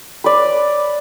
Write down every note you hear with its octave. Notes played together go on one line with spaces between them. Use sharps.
B4 D5